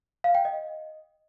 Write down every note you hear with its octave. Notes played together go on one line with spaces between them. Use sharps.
F5
G5
D#5